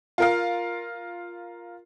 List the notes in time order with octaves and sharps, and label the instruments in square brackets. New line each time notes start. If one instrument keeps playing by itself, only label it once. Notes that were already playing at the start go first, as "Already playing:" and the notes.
[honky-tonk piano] F4 A#4 F5